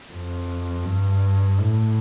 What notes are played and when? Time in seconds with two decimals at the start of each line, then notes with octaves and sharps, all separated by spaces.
0.12 F2
0.85 G2
1.61 A2